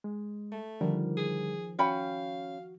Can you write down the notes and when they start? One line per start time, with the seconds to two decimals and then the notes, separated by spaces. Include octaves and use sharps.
0.04 G#3
0.52 A3
0.81 D3 D#3 F3 G3 A#4
1.17 G#4
1.79 C#4 F#4 F5 G5 B5